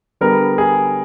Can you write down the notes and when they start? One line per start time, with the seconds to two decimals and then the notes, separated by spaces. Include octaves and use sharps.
0.21 D3 G3 B3 A#4
0.58 G#4